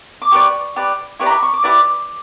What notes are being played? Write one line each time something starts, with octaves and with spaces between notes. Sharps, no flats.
D6
G4 B4 D5 C#6
G4 B4 D5
E4 G4 B4 D5 C#6
A#5
B5
C#6
D6
E4 G4 B4 D5 D6